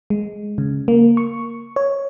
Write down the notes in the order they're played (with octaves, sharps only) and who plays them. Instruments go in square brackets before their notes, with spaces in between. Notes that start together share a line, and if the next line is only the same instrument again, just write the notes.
[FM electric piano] G#3
C#3
A#3
C#6
C#5